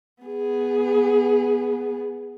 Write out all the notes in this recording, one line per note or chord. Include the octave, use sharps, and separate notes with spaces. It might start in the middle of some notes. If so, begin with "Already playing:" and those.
B3 G#4